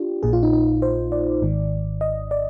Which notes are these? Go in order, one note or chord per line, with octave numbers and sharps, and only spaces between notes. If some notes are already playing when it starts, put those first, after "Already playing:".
Already playing: D4 F4 G4
A#1 A#2 G#4
F4
D#4
D#4
C5
D5
G#1 G#2 D#3
D#5
D5